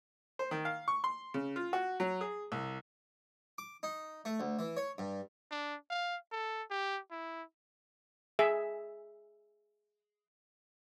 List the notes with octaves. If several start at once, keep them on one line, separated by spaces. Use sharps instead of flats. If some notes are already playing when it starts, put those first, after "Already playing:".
C5
D#3
F5
C#6
C6
C#3
F4
F#4
F#3
G#4
C2
D6
D#4
A3
D2
E3
C#5
G2
D4
F5
A4
G4
E4
G#4 E5